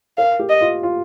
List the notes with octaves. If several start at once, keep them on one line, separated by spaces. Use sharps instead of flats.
A#4 F5
G4
D#5
F4
F4